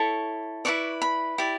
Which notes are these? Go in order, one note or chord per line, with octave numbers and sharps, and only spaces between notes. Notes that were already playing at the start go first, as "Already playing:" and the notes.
Already playing: E4 A4 C#5 C#6
E4 B4 D5 C#6
B5
E4 G4 D5